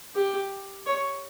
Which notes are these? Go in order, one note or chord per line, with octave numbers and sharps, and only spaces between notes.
G4
C#5